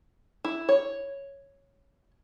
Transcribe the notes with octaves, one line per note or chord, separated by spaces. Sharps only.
E4
C#5